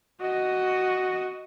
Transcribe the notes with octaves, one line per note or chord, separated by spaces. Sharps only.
F#4 D#5